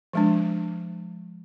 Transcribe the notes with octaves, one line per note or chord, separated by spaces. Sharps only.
F3 G#3 D4